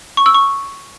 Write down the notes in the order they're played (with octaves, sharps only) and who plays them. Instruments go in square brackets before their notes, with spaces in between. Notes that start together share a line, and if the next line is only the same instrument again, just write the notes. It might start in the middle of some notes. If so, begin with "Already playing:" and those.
[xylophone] C#6
E6
C#6